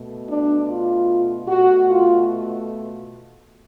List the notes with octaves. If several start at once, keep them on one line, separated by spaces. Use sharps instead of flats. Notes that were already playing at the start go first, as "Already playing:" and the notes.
Already playing: B2 A3
D4
F4
B2 A3 F#4
F4